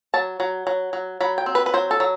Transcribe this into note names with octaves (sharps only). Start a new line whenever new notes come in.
F#3 A5
F#3
F#3
F#3
F#3 B5
G5
C4
B4
B4
F#3 C5
A4
F#3